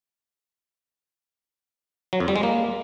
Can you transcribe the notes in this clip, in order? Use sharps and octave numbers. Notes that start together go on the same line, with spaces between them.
F#3
F2
G3
G#3
A#3